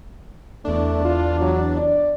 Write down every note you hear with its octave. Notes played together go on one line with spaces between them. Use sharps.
E2 A3 D4
F4
F#3
D5